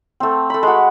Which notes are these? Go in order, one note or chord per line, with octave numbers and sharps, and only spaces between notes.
A3 C4
A3 B5
G#3 F#4